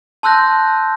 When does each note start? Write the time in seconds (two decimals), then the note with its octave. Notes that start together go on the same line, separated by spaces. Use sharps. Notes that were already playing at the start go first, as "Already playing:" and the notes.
0.23 A5 C6 E6 F#6 G6 A#6